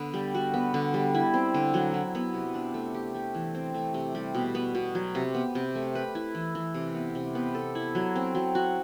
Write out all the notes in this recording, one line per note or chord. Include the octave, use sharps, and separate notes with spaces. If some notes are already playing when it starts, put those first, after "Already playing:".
Already playing: D3 B3
G3
F#4
B3
D3
G3
E4
C4
D3
F#3
E4
B3
C3
D4
A3
G4
A3
E3
C4
A3
C3
G3
B2
B3
B2
F#3
C3
B3
C3
A3
B4
E4
E3
E3
C3
B3
C3
B3
A4
E4
F#3
C4
F#3
F#4